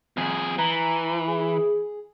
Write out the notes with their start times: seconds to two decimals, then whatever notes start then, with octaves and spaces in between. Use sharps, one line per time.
0.17 F2 G#4
0.58 E3 A#5
1.27 G#4